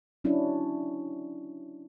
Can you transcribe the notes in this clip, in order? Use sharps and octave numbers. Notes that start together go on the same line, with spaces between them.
F#3 C#4 D4 E4